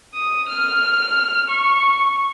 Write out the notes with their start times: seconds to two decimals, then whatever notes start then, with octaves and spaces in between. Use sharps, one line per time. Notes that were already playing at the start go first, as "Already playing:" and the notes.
0.14 D#6
0.48 F6
1.49 C#6